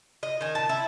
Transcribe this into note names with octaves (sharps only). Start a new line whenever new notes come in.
D#5
D#3 G#5
A#2 A5
E4